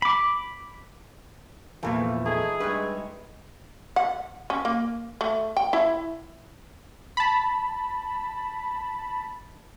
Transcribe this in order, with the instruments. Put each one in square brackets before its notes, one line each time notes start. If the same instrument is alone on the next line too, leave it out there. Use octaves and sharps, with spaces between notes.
[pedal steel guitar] B5 D6
[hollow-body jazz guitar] E2 A#2 F3 [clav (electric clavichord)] E3 A#3 [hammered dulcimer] A3 B4
[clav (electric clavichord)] A3 [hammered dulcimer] D#4 E5 [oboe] G#4
[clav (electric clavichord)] G2 [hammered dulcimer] G#3 G5 C#6 [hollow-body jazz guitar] B4
[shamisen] F#5
C#4
A#3
A3
G5
E4
[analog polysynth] A5 B5